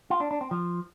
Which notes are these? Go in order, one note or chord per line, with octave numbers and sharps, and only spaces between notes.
F4
D4
D4
C4
F3